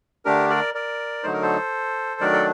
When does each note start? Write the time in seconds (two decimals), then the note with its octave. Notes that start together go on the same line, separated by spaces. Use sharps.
0.25 D3 A3 D4 G4 A#4
0.50 A#4 D5
0.74 A#4 D5
1.23 D3 F#3 A3 D#4 C5
1.33 A#4
1.42 A4 C5
2.21 D#3 F#3 A3 D4 A#4 D5
2.33 A4